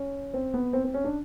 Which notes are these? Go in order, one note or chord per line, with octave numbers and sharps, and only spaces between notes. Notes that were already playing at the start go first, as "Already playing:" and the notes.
Already playing: C#4
C4
B3
C4
C4
C#4
D4